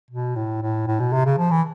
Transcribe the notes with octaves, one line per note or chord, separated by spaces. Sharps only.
B2
A2
A2
A2
B2
C3
C#3
F3
E3